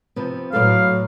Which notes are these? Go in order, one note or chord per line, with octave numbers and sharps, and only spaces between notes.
C3 F3 B3
A2 F#3 A4 B4 D5 F5